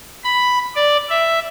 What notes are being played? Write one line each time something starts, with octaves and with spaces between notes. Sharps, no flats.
B5
D5
E5